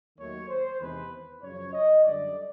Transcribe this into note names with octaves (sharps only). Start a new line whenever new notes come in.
D#2 D#3 F#3 A3 C#5
C5
E2 C3 D#3 G#3 B4
F#2 C#3 F3 C#5
D#5
F#2 D3 G3 D5